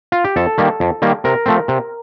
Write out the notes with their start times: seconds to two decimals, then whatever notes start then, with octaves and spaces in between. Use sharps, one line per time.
0.12 F4
0.24 G4
0.36 F2 A4
0.58 D#3 G3 A#3
0.80 F2
1.02 D#3 G3 A#3
1.24 C3 A#4
1.46 F3 A3 C4
1.68 C3